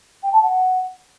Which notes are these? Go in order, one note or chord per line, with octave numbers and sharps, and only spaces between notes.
G5
A5
F#5